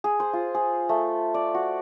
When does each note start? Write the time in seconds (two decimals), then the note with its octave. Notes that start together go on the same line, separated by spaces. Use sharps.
0.04 G#4
0.20 C5
0.33 F4
0.55 G#4
0.89 A3
1.34 D5
1.55 F#4